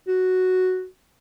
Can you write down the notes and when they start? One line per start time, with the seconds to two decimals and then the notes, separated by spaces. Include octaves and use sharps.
0.08 F#4